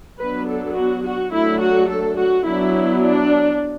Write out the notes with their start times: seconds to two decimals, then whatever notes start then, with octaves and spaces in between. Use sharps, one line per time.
0.19 F#3 B3 D4 B4
0.47 A4
0.76 F#4
1.04 F#4
1.32 F#3 A3 D4 E4
1.60 F#4
1.89 A4
2.17 F#4
2.46 F#3 B3 D4 E4
3.02 D4